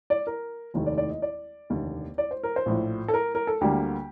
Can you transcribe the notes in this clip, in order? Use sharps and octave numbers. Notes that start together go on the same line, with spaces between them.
D5
A#4
F1 D#2 D#3 A3
D5
D5
D#5
D5
F1 D#2 D3
D5
C5
A#4
C5
A#1 A2 F3
A4
A#4
A#4
A4
D2 D3 G3 A#3 G4